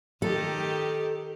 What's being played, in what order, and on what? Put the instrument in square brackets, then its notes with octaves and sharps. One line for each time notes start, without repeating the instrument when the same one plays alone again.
[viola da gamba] D#3 G4 [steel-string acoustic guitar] A4